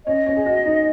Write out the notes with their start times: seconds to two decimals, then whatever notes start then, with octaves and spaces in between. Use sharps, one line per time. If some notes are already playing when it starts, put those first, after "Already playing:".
0.06 C#4 D#5
0.26 C#4
0.36 G#4
0.46 F#4
0.66 D#4